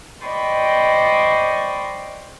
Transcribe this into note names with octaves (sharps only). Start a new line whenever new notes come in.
C5 D5 D#5 G5 B5 C#6